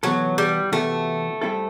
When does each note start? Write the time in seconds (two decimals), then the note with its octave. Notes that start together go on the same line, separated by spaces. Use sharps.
0.03 C3 E3 F#3 B3 F#4 A4
0.38 G3
0.72 C3 E3 A3 B3 F#4 A4
1.41 G3 C4 E4 A4